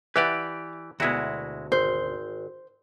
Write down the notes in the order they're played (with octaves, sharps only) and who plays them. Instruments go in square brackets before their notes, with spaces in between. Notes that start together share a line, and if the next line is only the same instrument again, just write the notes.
[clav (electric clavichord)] E3 G4 D5 [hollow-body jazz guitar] B4 E5 F#5
[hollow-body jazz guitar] D2 B2 [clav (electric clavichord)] G#3 E4 F#4
[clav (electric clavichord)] G#1 [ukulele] C5